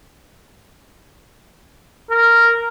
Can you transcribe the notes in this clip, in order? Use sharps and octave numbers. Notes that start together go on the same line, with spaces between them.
A#4